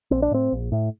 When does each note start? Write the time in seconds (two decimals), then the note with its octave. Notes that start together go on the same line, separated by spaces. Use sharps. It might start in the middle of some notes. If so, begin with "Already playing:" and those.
0.11 A#1 C4
0.22 D4
0.31 A2 C4
0.52 A#1
0.72 A2